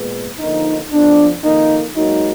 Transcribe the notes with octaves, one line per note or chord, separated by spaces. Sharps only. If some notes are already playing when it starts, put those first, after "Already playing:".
Already playing: A#2 G#3 B3
D3 F3 A#3 D#4
F2 F3 B3 D4
F2 D#3 A#3 D#4
G#2 F#3 A#3 D#4